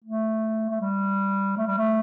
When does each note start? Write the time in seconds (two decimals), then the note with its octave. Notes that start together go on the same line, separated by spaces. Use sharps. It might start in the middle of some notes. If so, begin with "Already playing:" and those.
0.04 A3
0.70 A3
0.81 G3
1.57 A3
1.67 G3
1.78 A3